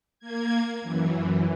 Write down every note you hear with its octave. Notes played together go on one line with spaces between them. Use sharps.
A#3 G#6
F#2 E3